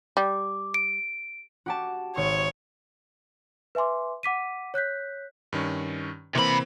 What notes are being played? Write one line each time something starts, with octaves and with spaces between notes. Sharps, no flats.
G3 D6
D7
F#4 G4 A5
G#1 C#5 C#6
B4 E5 G#5 C6 D6
F#5 D6 B6 D#7
C#5 F#6 G6 B6
G2 D#3 C#4
C3 E3 A#3 C4 B5